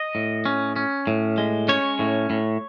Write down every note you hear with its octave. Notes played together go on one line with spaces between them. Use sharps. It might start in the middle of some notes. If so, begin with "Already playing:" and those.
Already playing: D#5
A2
C#4
C#4
A2
G#3
C#4 C#5
A2
A2